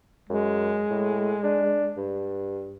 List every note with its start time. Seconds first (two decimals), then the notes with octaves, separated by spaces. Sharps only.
0.29 F#2 G#3
0.90 A2
1.43 D4
1.97 G2